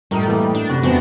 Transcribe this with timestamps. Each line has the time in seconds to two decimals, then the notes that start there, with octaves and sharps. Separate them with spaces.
0.11 F#2 A2 G3 A3 D#4 A#4
0.28 E3 A#3
0.55 D4
0.69 F#2 C3 F#4 B4
0.83 E2 C3 E3 B3 C4 D4 F#4